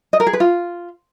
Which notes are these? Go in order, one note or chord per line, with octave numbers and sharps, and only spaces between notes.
D#5
A#4
G#4
B4
F4